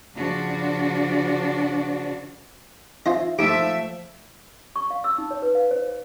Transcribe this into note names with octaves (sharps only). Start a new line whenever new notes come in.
C#3 F3 D4 F#4
C4 D#4 F4 D#5 E5
F3 A3 D#4 G4 E5 D7
C#6
F5
E6
D#4
C#5
B4
F5
C5
C5